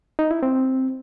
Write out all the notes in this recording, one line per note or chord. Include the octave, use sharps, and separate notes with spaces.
D#4
E4
C4